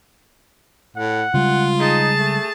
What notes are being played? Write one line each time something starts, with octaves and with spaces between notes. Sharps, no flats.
A2 F#5
C#3 G3 G#3 F4
D#4 G#4 A5
A3